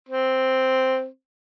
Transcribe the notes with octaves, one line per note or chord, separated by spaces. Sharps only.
C4